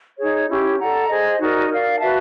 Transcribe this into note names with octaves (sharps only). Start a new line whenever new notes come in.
D#4 G#4 C#5
C#4 E4 G4
A4 D5 F#5 A#5
G#4 C5 D#5
D#4 F#4 A#4 D5
A#4 D5 F5
F#4 B4 E5 A5